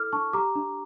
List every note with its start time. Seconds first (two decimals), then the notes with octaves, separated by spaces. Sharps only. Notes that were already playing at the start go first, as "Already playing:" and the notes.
Already playing: E4 A4 D6 F6
0.13 D4 A5 C#6
0.33 G4 A#5 D6
0.55 D4